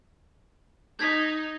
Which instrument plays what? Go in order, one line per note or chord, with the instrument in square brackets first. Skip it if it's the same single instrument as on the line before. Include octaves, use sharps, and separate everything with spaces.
[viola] D#4 [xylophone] G6 G#6 B6